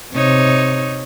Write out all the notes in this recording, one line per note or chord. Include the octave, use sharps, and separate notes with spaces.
C3 D#4 C#5